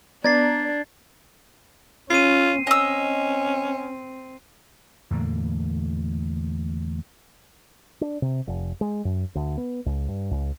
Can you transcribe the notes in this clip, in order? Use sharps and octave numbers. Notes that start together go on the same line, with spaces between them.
B3 D4 D5 A#5 G#6 A6 C7
C#4 F4 C7 D#7
C4 C#4 D#5 E6
E2 A2 D3 A#3
D4
C3
F1
G#3
F#2
D2
B3
C#2
G2
C#2